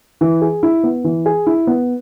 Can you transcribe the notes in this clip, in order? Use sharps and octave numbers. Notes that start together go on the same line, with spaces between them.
E3
G#4
E4
B3
E3
G#4
E4
B3